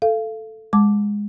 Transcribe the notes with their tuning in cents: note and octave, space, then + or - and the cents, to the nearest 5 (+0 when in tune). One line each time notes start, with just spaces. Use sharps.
A4 +0 F5 -25
G#3 -10 A5 +0 D6 +0